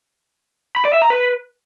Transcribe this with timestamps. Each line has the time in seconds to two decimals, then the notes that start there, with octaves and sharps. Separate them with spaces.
0.76 B5
0.85 D5
0.93 E5
1.02 A#5
1.10 B4